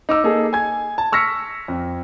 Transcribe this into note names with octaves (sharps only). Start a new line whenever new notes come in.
D#4 D6 E6
A#3 D#4 G#4 A4
G#5 G#6
A5
C#6 E6 F6 A#6 B6 C#7
F2